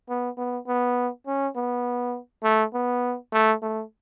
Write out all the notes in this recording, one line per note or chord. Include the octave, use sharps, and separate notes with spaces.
B3
B3
B3
C#4
B3
A3
B3
A3
A3